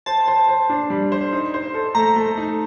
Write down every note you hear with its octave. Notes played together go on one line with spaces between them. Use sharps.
C5 A5
C5
C5
D4
G3
C5
D#4
C5
A4
A3 A#5
A3
D#4